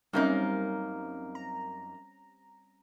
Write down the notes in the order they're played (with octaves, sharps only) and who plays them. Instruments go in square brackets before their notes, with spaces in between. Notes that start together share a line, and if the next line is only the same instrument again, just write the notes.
[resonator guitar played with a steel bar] F#2 A#3 D#4 [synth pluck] G3 C4 C#4
[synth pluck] A#5